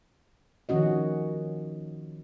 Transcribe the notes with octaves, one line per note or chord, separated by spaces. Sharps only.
D#3 F3 C#4 F#4 D#5